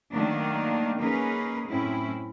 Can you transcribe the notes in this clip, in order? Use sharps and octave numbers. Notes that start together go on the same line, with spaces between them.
D#3 F#3 A3 A#3 D4
A#3 C#4 D#4 G#4 A#4 B4
F#2 A2 C4 C#4 E4